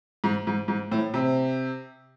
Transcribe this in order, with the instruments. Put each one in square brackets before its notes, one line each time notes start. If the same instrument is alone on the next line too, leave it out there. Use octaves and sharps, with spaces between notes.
[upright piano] G#2
G#2
G#2
A2
C3